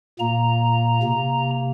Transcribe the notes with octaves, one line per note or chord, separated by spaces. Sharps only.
A#2 A#3 A#5
C3 A#3